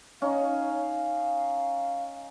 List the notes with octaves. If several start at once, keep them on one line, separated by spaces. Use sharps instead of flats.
C#4 D#4 F5